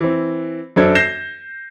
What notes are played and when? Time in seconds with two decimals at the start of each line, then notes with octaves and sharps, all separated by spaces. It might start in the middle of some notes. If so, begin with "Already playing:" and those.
0.01 E3 C4
0.76 F#2 F#3 D4 A4 C5 G#6
0.95 G6 A#6 C7 E7